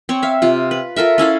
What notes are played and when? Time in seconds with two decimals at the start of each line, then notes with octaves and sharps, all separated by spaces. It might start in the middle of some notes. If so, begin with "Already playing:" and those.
0.09 C4 C#5
0.23 E5 F5
0.42 C3 F4
0.71 B4
0.96 F4 A4 A#4 E5
1.18 C#4 E4 A4 F5